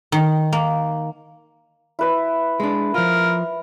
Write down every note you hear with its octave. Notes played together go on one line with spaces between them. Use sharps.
D#3
A#3
E4 B4 E5
G#3 D4
F3 F4 A#4